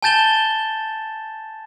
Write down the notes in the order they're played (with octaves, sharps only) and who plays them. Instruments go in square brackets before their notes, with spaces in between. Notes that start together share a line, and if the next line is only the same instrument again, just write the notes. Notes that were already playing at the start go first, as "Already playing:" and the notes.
[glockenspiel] G#5 A5 G6 A6 E7 G7